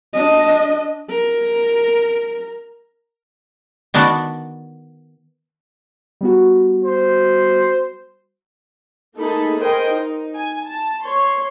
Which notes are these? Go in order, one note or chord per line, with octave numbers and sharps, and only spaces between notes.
D4 D#5
A#4
D#3 B3 D4 F#4 D5
G3 B3 F#4
C5
A3 A#3 D#4 G#4 A4 B5
G#4 A#4 C5 D#5 G5
D#4
G#5
A5
C#5 C6